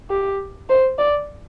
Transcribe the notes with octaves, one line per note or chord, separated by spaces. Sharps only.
G4
C5
D5